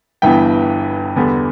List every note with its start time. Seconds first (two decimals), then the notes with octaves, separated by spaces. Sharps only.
0.22 G1 G2 E3 B3 G5
1.16 E2 D3 G3 B3